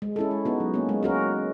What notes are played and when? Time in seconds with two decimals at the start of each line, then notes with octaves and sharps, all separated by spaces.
0.02 G#3
0.16 C#4 E4 A4
0.31 G#3
0.45 B3 D#4 F#4
0.60 F#3
0.74 A#3 C#4
0.89 G#3
1.03 C#4 F#4 A#4